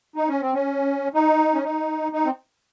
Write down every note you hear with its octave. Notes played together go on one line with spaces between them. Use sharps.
D#4
C#4
C4
C#4
D#4
C#4
D#4
D#4
C4